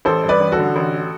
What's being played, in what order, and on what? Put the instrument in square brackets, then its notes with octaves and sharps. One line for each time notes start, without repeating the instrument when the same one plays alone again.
[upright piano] A1 A4 C5
G2
B4 D5
A1
F#4 A4
D3
A1